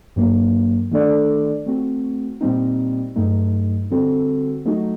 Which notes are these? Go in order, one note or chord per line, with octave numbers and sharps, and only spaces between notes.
G2 F#3 A#3
D#3 A3 D4 A4 D5
A3 C4 F#4
A#2 G3 C4 D#4
G2 F#3 A3 D#4
D3 G3 C4 F#4 A4
F#3 A3 D#4 F#4